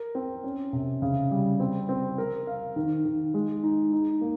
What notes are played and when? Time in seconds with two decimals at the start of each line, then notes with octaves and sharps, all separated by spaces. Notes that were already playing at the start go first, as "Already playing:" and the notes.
Already playing: A#4
0.15 C4
0.44 C#4
0.73 C3
1.02 C#3
1.31 G3
1.60 C4
1.89 C4
2.18 A#4
2.47 F5
2.76 D#3
3.05 D#3
3.34 G#3
3.63 D#4
3.92 D#4
4.21 A#3